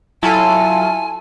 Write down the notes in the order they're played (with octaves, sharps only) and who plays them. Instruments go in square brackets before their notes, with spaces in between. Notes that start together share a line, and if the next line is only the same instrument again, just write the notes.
[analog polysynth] F#3 F4 A4 [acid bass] E4 [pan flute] G#5 [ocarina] A5